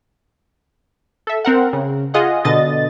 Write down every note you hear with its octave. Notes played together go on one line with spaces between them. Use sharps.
A4 E5
C4 A#4 F#5
C#3
F4 G#4 D#5 F#5
B2 D3 D#5 A6